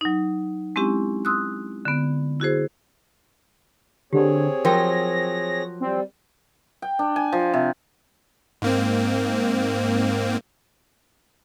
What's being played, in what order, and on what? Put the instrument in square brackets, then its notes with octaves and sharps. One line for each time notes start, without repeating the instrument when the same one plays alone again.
[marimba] F#3 D#4
G#3 C4 C#4 E4 G4
C6 D#6 E6 F#6
D3 B3
E4 F#4 G#4 C5
[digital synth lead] D3 [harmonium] C4 G#4 C#5 [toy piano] G4
[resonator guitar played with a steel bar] F3 F#3 [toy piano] A#4 G5 [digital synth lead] A#6
[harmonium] G3 [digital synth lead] C4
[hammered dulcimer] G5
D4
G#5
F3
C3
[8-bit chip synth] G#2 A#3 C4